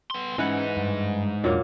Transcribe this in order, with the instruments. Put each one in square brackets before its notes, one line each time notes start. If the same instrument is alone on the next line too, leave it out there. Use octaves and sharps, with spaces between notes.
[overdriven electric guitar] B3 C6
[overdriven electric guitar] G#2 D#4 [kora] E3 B4 F#5 [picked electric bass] C#4
[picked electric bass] G2
[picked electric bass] E2 D4 [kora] A#2 F#3 A#3